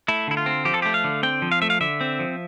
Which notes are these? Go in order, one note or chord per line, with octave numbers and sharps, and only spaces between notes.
A3 E4
D3 E4
F4
C4
F3 G4
A4
A3 G4
F5
D3
C4 G5
F3
F5
A3 E5
F5
D3 E5
C4
F3